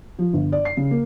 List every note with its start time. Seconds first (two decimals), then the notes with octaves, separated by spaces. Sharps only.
0.19 F3
0.33 G1
0.52 D5
0.65 C7
0.77 C#3
0.91 A#3